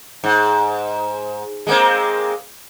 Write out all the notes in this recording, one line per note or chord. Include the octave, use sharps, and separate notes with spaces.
G#2
G#3 A#3 C4